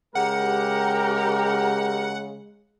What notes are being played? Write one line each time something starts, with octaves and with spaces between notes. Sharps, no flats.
C#3 G#3 G4 A#4 F#5